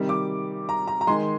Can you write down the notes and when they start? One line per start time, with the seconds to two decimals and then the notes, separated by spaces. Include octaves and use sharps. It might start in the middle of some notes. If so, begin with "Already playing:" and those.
Already playing: C3 D#3 G3
0.09 D6
0.69 A#5
0.87 A#5
1.01 A#5
1.07 D#3 G#3 C6